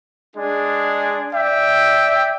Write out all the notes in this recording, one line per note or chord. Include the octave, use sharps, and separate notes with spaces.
G#3 D4 G#4
D5 E5 G5